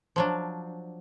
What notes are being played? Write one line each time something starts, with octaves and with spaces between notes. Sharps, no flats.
F3 F#3 D4